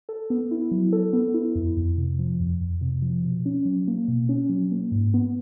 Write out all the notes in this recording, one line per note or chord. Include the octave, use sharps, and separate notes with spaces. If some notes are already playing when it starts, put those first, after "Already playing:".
A4
B3
E4
F#3
A4
B3
E4
F2
F2
C3
F3
F2
F2
C3
F3
B2
C#4
F#3
A#3
B2
C#4
F#3
A#3
G#2
B3